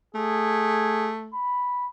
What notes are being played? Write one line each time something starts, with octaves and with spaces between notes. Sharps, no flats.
A3 G#4
B5